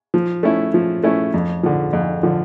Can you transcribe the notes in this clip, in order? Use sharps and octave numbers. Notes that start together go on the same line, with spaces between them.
F3
A3 C#4 E4
F3
A3 C#4 E4
F2
D3 F3
F2
D3 F3